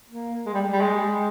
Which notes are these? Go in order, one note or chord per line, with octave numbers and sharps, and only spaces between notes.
A#3
G#3
G3
G3
G#3